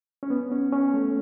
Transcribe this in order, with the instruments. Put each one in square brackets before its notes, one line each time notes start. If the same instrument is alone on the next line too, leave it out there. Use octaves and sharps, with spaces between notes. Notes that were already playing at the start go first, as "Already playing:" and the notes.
[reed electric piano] C#4
B3
C#4
C#4
A3